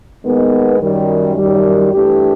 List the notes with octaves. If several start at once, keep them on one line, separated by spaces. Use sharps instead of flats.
D#2 D#3 G#3 B3
F#2 D#3 G3
F#2 D#3 G3
G2 E3 A3 D4 G4